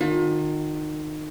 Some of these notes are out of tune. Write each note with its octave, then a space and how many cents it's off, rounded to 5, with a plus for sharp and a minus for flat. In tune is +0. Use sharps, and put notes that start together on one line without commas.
D#3 -25 F4 +40